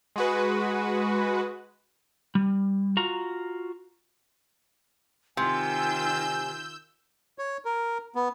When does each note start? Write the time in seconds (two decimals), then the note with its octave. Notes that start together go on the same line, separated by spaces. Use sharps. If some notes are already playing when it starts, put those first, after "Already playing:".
0.16 G#3 F#4 B4
2.35 G3
2.97 F4 F#4 A#5
5.37 C3 D#3 F4 G#5 E6 G6
7.38 C#5
7.65 A#4
8.15 B3